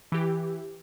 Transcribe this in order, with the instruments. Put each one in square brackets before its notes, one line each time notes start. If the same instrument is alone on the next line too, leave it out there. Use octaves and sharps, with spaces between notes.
[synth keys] E3 G4